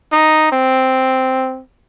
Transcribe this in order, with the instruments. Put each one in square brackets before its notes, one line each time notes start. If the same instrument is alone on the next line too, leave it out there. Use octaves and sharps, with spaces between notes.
[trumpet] D#4
C4